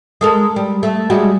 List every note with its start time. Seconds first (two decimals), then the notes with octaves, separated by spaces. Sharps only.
0.21 G#3 A4 A#4
0.56 G3
0.83 A3
1.10 G3 G#3 F#4